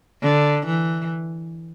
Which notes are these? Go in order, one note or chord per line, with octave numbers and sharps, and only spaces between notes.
D3
E3